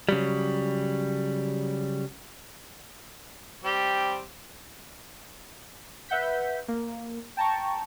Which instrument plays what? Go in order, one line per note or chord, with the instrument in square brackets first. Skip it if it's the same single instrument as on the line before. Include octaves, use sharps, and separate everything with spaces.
[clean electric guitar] C#3 F#3 G3
[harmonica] G3 C4 G4
[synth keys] B4 E5 F#5 G6 B6
A#3
G5 A5 A#5 C#6